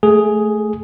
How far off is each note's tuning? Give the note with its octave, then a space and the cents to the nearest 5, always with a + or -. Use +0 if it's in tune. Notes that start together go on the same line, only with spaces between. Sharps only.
A3 -10 G#4 +5